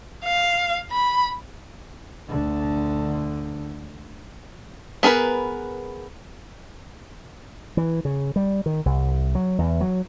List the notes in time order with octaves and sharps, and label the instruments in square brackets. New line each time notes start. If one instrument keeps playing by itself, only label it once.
[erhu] F5
B5
[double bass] D2 D3
[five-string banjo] B3 G#4 A#4 B4
[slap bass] E3
C#3
G3
D#3
C2
F#3
E2
F#3